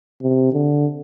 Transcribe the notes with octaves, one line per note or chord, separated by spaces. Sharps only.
C3
D3